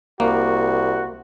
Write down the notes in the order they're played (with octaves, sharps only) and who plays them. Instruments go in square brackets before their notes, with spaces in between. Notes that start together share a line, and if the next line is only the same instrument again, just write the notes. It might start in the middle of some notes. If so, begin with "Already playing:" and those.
[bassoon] C2 [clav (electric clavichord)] A#3 [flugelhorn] F#4